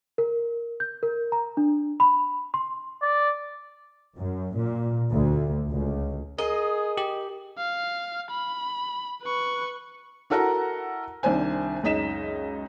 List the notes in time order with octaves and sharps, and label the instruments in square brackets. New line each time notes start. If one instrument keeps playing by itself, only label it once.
[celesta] A#4
G6
A#4
A#5
D4
B5
C6
[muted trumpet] D5
[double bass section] F#2
A#2
D2
C#2
[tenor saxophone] G#4 [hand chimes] A#4 [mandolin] D#5
[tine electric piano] G4
[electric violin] F5
B5
B4 C#6
[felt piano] E4 F#4 A4 A#4 F#5 A#5
C2 D#3 D4 C5 G#5
C#2 F#2 D#4 D#5 B6 E7